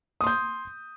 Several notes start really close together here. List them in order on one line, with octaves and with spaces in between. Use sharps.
D#6 C6 G6